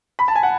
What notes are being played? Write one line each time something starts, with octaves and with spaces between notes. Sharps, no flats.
B5
A5
G#5
F#5